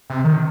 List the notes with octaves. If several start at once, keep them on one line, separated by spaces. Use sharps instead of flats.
C3
D#3